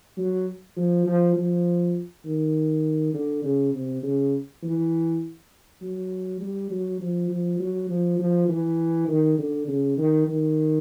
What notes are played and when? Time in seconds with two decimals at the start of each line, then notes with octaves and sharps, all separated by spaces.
0.17 F#3
0.77 F3
1.06 F3
1.36 F3
2.25 D#3
3.14 D3
3.44 C#3
3.73 C3
4.03 C#3
4.63 E3
5.82 F#3
6.41 G3
6.70 F#3
7.01 F3
7.30 F3
7.60 F#3
7.89 F3
8.19 F3
8.49 E3
9.08 D#3
9.39 D3
9.68 C#3
9.97 D#3
10.28 D#3